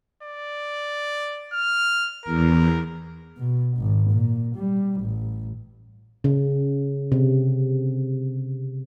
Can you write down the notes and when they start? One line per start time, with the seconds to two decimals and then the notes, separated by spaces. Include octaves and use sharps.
0.24 D5
1.53 F6
2.25 E2 A#4
3.37 B2
3.77 G#1
4.10 A#2
4.56 G3
5.01 A1
6.24 C#3
7.12 C3